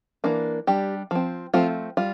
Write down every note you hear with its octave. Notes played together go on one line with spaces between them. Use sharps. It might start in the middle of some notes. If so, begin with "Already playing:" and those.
E3 A#3 D4
G3 D4 G4
F3 C4
F3 A3 C4 F4
G3 F4